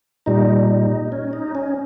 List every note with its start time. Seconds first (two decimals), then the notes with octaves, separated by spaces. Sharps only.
0.26 A#2 G3 D#4
0.70 D#4
1.12 C#4
1.33 D#4
1.55 C#4